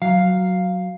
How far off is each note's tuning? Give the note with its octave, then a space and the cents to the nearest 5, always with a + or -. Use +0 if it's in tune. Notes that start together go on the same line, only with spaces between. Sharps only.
F#3 +0 F5 +0